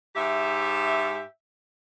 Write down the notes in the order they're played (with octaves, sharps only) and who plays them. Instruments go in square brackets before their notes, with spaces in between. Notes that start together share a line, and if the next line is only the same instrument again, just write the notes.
[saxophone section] G#2 G4 E5